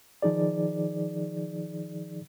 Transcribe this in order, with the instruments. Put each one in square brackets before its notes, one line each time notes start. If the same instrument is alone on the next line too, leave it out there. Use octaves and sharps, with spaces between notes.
[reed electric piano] D#3 F3 D#4 G#4 D5